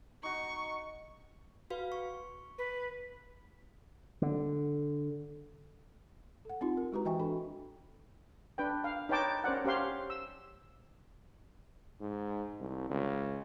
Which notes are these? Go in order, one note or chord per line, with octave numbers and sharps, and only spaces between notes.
D#4 F#4 C#6
F#4 B4 F5
C#6
B4
D3
A4 F#5
C4 D#4 F4 G4
A#4
G#3 E4 F#4 G4 B4 A#5
E3 D#5 E5 G5 G#5 C#6
D4 F#4 A4 B5
D4 B4 G5
F5
D#4 B4 C#5 G5 A5 D6
C#4 A#4 C5 D5 F#5
C#4 G4 C5 F5 C6
E6
G#2
C2
C#2